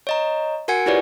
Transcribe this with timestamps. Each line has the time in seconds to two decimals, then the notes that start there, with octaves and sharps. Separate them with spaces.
0.07 C#5 D#5 A#5
0.68 F#4 A#4 F#5 G#5 G#6 C#7
0.86 E4 F4 G4 B4 C#5 D5